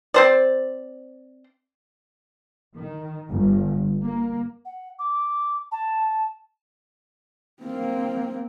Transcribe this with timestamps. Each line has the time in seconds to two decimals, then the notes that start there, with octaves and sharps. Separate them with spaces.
0.14 C4 C5 D5
2.74 D#3
3.28 G1
4.04 A#3
4.65 F#5
4.99 D6
5.71 A5
7.63 A#3 C4